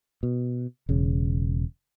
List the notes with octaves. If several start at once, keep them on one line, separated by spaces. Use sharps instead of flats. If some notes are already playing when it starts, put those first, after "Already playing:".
B2
E1 C#3